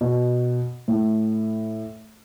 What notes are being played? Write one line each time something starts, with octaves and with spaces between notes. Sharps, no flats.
B2
A2